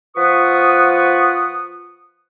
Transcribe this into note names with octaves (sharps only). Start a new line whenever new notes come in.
F3 F4 B4 F#5 C#6 D#6